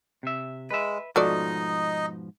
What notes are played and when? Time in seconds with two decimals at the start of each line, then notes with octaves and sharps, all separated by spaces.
0.23 C3 E5
0.71 G#3 B4 E5
1.16 G#2 B2 F3 A3 D#4 F#4 D5 D#5